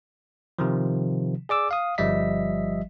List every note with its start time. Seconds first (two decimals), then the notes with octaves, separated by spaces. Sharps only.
0.59 C3 D#3 F3
1.49 G#4 D5 D6 E6
1.71 F5 D#6
1.98 G1 F3 G3 D#5 E5 B6